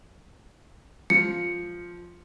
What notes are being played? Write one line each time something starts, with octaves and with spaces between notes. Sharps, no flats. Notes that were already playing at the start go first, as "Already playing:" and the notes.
F3 C#7